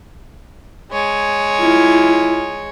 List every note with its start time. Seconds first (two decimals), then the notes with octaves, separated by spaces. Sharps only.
0.92 G#3 C#5
1.60 E4 F4